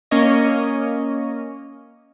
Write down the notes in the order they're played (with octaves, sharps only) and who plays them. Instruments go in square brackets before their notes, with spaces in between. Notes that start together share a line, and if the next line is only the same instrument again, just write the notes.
[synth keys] A#3 C#4 C#5 D#5